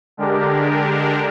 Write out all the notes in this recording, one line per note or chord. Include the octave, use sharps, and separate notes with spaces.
D3 G#3 D4 G4 A#4